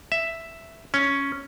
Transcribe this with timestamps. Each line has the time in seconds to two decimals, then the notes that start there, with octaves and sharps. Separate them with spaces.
0.12 E5
0.94 C#4